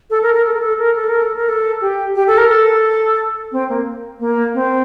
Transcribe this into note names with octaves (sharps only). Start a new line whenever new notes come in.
A4
A#4
A#4
A4
A#4
A4
A#4
A4
A#4
A4
A#4
A4
G4
G4
A4
A#4
A4
C4
A#3
A#3
C4